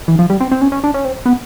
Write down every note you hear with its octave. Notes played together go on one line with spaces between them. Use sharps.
E3
F3
G3
C4
C4
C#4
C#4
D4
C#4
C4
B3